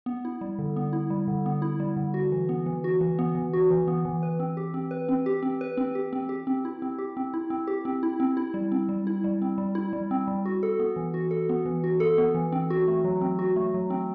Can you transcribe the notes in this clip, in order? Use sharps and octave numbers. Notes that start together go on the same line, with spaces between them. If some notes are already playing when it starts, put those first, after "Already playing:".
B3
E4
G3
D3
B3
E4
G3
D3
B3
E4
G3
D3
F#4
E3
B3
E3
F#4
E3
B3
E3
F#4
E3
B3
E3
B4
C4
G4
C4
B4
C4
G4
C4
B4
C4
G4
C4
G4
C4
E4
C4
G4
C4
E4
C4
G4
C4
E4
C4
E4
G3
C4
G3
E4
G3
C4
G3
E4
G3
C4
G3
F#4
A4
B3
E3
F#4
A4
B3
E3
F#4
A4
B3
E3
C4
F#4
A3
F#3
C4
F#4
A3
F#3
C4